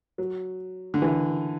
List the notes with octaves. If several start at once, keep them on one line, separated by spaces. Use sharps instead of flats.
F#3
D3
E3